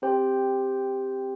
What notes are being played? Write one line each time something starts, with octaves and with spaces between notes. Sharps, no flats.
C4 G4 C5 G5